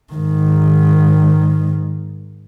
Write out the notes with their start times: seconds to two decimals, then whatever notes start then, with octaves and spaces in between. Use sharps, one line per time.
0.12 G#2 D#3